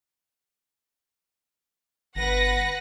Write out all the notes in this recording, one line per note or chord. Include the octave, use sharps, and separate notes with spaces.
G1 B4 F#5 A#6